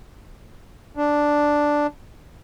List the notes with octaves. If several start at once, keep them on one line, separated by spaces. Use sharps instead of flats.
D4